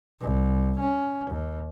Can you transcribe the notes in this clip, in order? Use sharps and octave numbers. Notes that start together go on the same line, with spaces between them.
C2
C#4
D#2